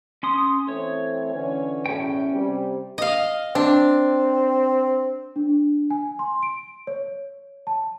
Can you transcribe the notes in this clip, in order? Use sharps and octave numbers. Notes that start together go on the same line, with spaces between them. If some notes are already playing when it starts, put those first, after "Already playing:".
C#4 C6 D#6
E3 A3 C4 C#5
D3 E3 C#4
B1 E2 A2 C#4 G5
C3 G3
D#5 F5
C4 D4
D4
G#5
C6
D7
C#5
A5